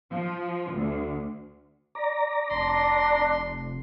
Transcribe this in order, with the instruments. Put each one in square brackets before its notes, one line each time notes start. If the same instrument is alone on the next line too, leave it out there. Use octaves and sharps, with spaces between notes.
[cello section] F3
D2
[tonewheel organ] D5 A#5
[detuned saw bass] F1 [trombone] D4 [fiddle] C6